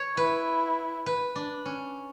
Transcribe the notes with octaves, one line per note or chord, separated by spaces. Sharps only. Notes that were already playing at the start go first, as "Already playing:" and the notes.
Already playing: C#5
E4 B4
B4
D4
C#4